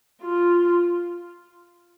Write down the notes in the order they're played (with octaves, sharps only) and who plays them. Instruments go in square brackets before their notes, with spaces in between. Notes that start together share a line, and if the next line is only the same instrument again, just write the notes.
[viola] F4